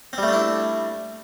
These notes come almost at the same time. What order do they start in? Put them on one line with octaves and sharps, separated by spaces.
C4 G3 A3 D4 E4